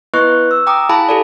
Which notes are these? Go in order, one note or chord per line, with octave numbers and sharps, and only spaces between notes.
B3 E4 B4 D#5 C#6 F#6
E6
G5 A#5 D6 D#6
E4 G#4 F5 G#5 A5 B5
G4 A4 D5